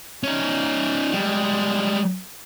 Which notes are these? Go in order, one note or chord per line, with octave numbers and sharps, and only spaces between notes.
C#4 D#4
G3 G#3